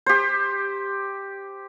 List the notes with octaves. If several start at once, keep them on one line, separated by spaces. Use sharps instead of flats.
G4 C5